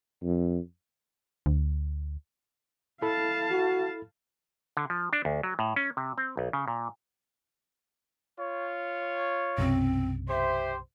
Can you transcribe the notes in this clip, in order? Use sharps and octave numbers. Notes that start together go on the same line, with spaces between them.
F2
D2
E4 A4 F5 A5 B5
F#4
D3
F3
D4
D2
F#3
A2
C#4
C3
C4
B1
C#3
A#2
F4 C#5
B1 F#2 C3 C4
G4 C5 E5